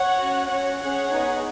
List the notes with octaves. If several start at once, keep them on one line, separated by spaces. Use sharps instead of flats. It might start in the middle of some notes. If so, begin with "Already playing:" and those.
Already playing: C#5 F#5
C#4 F#4
C#4 F#4 C#5 F#5
C#4 G#4 C#5 F#5
B3 D#4 G#4